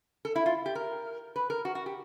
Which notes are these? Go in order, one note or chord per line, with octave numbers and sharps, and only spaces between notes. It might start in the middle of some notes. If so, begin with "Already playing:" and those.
A4
E4
F4
G4
A#4
B4
A#4
F#4
F#4
G4